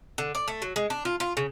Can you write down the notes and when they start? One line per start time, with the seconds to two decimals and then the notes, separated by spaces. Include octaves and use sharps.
0.18 D3
0.35 D5
0.48 A3
0.62 F#3
0.76 G#3
0.90 D4
1.05 F4
1.20 F4
1.37 C#3